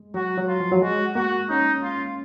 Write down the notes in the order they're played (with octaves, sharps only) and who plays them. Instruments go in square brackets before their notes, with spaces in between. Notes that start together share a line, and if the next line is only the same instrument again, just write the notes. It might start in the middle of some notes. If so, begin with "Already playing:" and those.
Already playing: [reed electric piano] G#3
[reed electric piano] F#3 [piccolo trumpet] F#4
[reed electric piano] F#3
[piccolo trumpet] F4
[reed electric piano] F3
F#3
[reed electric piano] G#3 [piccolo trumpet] F#4
[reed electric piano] A#3 [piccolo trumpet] F#4
[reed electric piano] C#4 [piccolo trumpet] D#4
[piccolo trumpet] F4